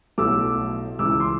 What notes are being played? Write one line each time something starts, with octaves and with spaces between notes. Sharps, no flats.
B1 A2 F#3 A3 D6 E6
C#2 C#3 E3 D6 E6
C6 D6